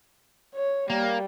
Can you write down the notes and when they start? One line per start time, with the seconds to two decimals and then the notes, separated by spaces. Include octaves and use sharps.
0.55 C#5
0.90 G3 A#3